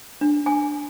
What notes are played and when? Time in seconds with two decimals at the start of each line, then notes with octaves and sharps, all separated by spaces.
0.21 D4
0.46 G#5